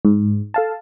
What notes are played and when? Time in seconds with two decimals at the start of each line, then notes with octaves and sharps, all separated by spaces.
0.05 G#2
0.54 A4 F5 A5